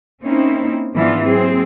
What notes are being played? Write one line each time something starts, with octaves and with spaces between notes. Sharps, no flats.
A#3 C4 C#4 D#4 E4
G#2 E3 F3 B3 D4 F4
F#3 A#3 C4 G#4